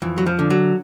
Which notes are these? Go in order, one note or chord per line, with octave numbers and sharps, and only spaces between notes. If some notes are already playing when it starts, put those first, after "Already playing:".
F2 E3
F#3
F3
D3
F#3